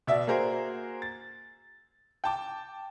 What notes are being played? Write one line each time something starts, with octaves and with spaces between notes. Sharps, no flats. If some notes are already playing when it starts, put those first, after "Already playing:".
B2 D5 E5
A#3 F#4 G#4 A#4 C5
A6
G5 A5 D6